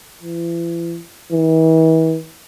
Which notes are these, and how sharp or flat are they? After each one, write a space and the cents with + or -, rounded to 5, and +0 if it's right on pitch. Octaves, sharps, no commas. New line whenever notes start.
E3 +40
E3 -40